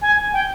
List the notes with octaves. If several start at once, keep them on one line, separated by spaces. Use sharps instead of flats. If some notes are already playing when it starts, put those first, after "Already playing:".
G#5
G5